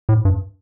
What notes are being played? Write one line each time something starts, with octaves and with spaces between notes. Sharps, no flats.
A2
G2